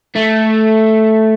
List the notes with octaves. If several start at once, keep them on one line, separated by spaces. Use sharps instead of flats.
A3